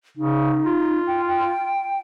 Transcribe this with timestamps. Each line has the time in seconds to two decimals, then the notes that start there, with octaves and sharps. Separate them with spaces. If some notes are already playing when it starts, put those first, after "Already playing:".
0.17 C#3 D#4
0.66 F4
1.07 G5
1.28 G5